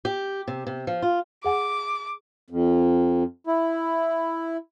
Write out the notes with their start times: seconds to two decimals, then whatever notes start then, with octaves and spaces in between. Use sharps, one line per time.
0.05 G4
0.48 C3
0.67 C3
0.87 F3
1.02 F4
1.44 G#4 F#5 G#5 D6
2.50 F2
3.47 E4